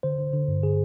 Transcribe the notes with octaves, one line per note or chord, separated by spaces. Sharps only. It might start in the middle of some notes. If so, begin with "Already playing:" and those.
D3 C5
D3
D3
G2
D3 G#4